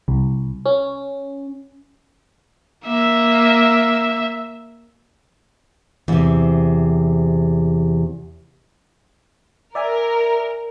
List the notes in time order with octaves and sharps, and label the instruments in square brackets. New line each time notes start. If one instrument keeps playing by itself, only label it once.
[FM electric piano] C2
C#4
[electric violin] A#3 E5
[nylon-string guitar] E2 C3
[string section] A#4 [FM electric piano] D5 E5 G#5